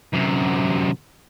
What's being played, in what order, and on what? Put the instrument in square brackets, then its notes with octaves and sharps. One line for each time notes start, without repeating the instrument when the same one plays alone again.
[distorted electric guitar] F#2 C3